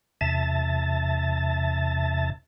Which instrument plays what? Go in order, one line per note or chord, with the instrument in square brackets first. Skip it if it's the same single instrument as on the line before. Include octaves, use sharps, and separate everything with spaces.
[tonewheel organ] E2 C3 E5 A5 A6